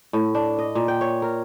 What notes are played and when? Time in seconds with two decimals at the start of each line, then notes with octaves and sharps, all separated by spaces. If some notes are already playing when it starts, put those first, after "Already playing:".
0.13 A2
0.35 D4
0.59 D#5
0.75 A#2
0.88 G5
1.01 C#5
1.22 A#4